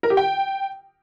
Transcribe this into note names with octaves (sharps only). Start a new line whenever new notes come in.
A#4
G4
G5